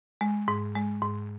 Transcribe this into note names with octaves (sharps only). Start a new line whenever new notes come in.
G#3
G#2
G#3
G#2